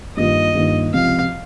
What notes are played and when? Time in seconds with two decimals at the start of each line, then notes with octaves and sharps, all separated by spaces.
0.17 G2 D#3 A#3 F4 D#5
0.55 G2 D#3 A#3 F4
0.93 C#2 C3 F3 C4 G4 F5